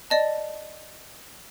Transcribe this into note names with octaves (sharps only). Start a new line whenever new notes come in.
D5 D#5 A5